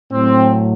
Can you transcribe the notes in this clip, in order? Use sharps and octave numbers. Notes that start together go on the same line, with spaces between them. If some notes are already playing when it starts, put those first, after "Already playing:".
A2 F#3 C4